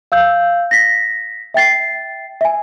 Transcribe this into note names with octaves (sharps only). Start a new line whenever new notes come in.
F5 E6 G6
A#6 B6
E5 G5 A6 C7
E5 G#5